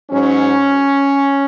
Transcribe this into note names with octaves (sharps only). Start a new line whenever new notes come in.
G#2 F#3 C#4